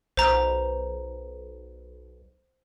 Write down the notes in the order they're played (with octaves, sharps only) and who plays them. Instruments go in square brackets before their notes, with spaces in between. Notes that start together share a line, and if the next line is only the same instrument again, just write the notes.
[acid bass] B1 [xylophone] C5 A#5